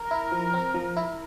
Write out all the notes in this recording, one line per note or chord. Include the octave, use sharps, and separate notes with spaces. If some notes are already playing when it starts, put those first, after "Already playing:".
Already playing: A#4
E4
F3
C4
F3
E4